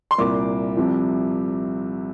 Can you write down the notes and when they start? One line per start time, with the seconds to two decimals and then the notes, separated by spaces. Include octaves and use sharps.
0.11 C6
0.18 C2 A#2 A#3 D6
0.77 C2 C3 F3